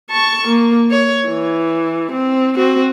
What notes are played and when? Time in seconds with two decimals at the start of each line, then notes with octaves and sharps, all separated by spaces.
0.11 A5 C#6
0.48 A#3
0.91 C#5
1.28 E3
2.12 C4
2.56 C4 F#4